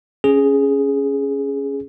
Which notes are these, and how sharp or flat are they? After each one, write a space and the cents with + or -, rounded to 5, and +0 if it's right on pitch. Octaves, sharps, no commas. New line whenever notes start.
C#4 +0 G#4 +0